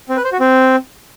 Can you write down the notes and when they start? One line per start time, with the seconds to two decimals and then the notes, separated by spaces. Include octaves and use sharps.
0.09 C4
0.17 B4
0.24 C5
0.32 F#4
0.40 C4